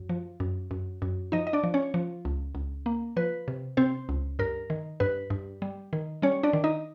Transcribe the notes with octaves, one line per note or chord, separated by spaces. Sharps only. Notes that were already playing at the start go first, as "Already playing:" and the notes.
Already playing: F#2
F3
F#2
F#2
F#2
F3 D#4 D#5
D#5
D4 D5
F3
C#4 C#5
F3
C#2
C#2
A#3
F3 B4
C3
C3 C4 C5
C#2
G2 A#4
D#3
G2 B4
G2
G3
D#3
G3 C#4 C#5
D4 D5
D#3
D#4 D#5